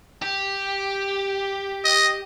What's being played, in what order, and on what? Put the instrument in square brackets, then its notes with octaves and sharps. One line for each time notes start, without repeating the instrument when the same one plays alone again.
[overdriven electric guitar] G4
[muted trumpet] D#5